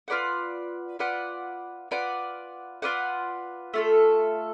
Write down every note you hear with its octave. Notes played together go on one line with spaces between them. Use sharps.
F4 B4 D5 F#5
F4 B4 D5 F#5
F4 B4 D5 F#5
F4 B4 D5 F#5
A3 F4 A4